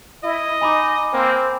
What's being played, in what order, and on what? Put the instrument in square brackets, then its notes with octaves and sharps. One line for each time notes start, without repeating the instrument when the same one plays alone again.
[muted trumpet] E4 [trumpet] D#5
[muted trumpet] D#4 [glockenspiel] G#5 B5 D6
[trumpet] A#3 [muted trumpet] C4